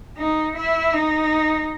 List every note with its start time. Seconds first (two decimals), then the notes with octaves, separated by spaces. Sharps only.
0.17 D#4
0.56 E4
0.93 D#4